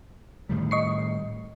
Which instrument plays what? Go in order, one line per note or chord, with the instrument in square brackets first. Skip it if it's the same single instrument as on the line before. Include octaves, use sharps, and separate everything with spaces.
[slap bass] A2 D#3 G3
[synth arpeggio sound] D#5 C#6 C7